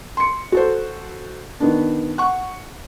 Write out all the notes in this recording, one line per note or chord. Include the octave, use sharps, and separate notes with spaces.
C6 C#7
F#4 A4 C5
D#3 B3 D4
F#5 C#6